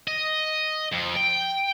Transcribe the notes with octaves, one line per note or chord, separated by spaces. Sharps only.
D#5
F2
G5